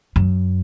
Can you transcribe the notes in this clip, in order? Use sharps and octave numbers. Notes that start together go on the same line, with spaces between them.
F#2